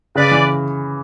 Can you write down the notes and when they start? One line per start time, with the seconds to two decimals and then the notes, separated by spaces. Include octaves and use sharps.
0.15 C#3 B4 D5
0.31 E3